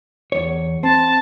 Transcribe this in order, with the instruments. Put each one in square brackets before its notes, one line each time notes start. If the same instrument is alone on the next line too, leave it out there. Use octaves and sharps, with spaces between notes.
[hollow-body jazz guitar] E2 C#5
[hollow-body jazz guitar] C4 [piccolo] A5